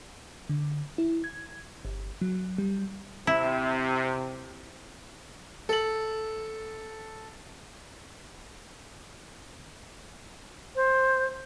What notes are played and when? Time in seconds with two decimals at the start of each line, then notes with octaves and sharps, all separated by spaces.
0.49 D3
0.98 E4
1.24 G#6
1.85 G1
2.21 F#3
2.58 G3
3.27 C3 E4
5.69 A4 F#7
10.76 C5